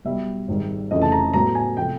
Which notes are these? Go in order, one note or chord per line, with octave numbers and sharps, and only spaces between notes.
B1 B2 G3 E5
G#1 G#2 D#3 G3
F1 F2 C#3 E3 A3 D#5
A5
A#5
A2 F#3 B3 A#5
G#5
C3 F3 A3 G5